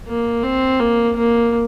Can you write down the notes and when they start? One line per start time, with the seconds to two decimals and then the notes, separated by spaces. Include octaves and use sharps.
0.08 A#3
0.43 C4
0.80 A#3
1.16 A#3